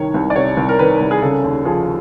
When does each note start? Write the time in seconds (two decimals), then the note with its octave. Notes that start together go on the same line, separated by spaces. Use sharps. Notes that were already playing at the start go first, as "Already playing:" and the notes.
Already playing: C2 C3 D#3 C#5
0.14 C2
0.30 D5
0.36 C3 C#5
0.57 C2
0.69 A#4
0.79 D#3 B4
1.01 C2
1.11 G#4
1.22 C#3 A4
1.44 D#2
1.65 F3 G#4